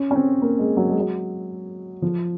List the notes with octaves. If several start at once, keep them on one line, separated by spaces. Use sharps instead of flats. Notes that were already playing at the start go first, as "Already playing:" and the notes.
Already playing: C#4
C#4
C4
A#3
G#3
F#3
G#3
F#3
F3